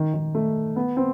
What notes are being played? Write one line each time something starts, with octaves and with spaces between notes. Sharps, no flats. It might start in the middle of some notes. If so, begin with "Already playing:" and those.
Already playing: D#3
D#3
A3
B3
C4